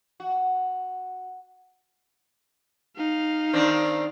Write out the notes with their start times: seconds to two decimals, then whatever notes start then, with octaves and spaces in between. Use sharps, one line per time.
0.20 F#4
2.96 D#4 F5
3.53 D#3 C4 D4